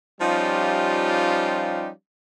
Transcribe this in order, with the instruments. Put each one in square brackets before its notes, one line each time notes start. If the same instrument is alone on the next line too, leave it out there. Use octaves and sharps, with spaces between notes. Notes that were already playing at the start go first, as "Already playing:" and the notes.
[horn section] F3 G3 C#4 D#4 F4 G4